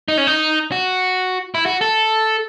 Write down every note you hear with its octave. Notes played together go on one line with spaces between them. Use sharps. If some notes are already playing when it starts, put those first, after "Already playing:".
D#4
C#4
D#4
F#4
E4
F#4
A4